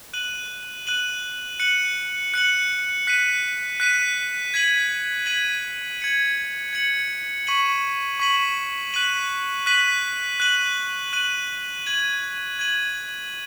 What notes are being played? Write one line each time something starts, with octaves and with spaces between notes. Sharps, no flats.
F#6 D#7 F#7
F#6 D#7 F#7
F#6 C#7 F#7
F#6 C#7 F#7
F#6 B6 D#7
F#6 B6 D#7
G#6 B6 D#7 F#7
G#6 B6 D#7 F#7
G#6 C#7 F#7
G#6 C#7 F#7
C#6 B6 D#7 F#7
C#6 B6 D#7 F#7
F#6 B6 D#7 F#7
F#6 B6 D#7 F#7
F#6 D#7 F#7
F#6 D#7 F#7
G#6 D#7 F#7
G#6 D#7 F#7